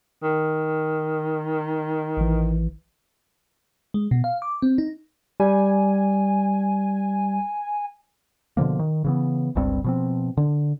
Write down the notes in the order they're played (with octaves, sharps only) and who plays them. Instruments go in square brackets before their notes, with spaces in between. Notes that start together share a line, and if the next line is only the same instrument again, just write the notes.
[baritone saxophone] D#3
[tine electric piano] A1 E3
[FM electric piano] G#3
B2
F5
D6
C4
D#4
[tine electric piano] G3 [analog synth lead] G#5
[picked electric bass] B2 D3 F3 A#3
D#3
C#3 E3 B3
G1 C#2 G2 C4
B2 F3 C4
D3